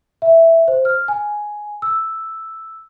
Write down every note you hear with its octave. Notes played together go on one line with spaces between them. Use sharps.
E5
C5
F6
G#5
E6